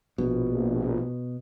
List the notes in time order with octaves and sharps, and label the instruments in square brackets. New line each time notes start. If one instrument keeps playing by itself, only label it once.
[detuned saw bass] A#1 [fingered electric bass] B2